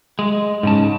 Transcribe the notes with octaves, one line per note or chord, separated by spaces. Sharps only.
G#3
G#2 C#3 A5